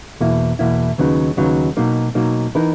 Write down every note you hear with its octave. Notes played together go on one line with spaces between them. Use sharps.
E2 B2 A#3 E4
E2 B2 A#3 E4
D#2 C#3 F#3 B3 D#4
D#2 C#3 F#3 B3 D#4
B2 F#3 A#3 D#4
B2 F#3 A#3 D#4
E3 B3 D#4 A#4